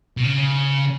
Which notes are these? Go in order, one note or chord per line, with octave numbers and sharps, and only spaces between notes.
B2
C#3